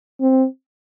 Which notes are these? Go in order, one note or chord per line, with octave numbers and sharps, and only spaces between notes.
C4